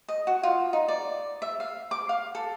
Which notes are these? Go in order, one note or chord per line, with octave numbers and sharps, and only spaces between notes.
D#5
F#4
F4
D#4
D5
E5
F5
D6
F5
A4